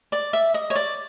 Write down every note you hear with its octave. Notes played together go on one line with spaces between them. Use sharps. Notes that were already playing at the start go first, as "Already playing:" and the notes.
D5
E5
D#5
C#5
D5